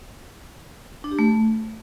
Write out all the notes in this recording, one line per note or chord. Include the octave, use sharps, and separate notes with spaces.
D4
G4
A3